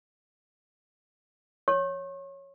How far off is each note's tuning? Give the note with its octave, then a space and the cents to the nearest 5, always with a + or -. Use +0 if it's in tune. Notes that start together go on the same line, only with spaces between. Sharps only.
C#5 +0 C#6 -40